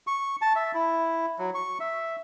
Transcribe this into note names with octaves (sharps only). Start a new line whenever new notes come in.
C#6
A5
E5
E4
F#3
C#6
E5